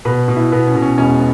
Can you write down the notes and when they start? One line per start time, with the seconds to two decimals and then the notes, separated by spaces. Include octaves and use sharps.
0.05 B2 B4
0.28 B2
0.36 E4
0.52 B2 B3
0.67 C#4
0.76 B2
0.82 C#4
0.98 E1 C#4